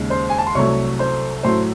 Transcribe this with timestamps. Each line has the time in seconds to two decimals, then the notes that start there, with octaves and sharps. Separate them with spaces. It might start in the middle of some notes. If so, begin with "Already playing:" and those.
Already playing: D#2 C#3 G#3
0.10 C5 C6
0.30 G#5
0.38 A5
0.47 C6
0.55 C2 C3 F#3 A3 C#5 C#6
0.99 C5 C6
1.43 A2 F#3 A3 C5 C6